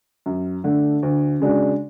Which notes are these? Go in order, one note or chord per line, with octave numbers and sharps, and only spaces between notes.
F#2
D3 A3
D2
C#3 G#3 D4 F#4